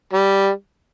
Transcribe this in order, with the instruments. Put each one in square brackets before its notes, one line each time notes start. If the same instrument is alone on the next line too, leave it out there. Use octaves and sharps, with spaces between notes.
[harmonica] G3